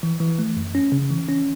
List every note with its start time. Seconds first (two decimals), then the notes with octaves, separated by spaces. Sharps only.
0.03 E3
0.20 E3
0.39 A3
0.57 F#2
0.75 C#4
0.92 C#3
1.11 E3
1.28 C#4